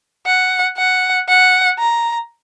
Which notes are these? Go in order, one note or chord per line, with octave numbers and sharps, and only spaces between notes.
F#5
F#5
F#5
A#5